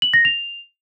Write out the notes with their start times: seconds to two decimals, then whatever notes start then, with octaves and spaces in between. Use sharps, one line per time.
0.02 F#7
0.14 A#6
0.25 F7